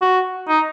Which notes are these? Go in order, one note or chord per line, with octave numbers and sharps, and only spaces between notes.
F#4
D#4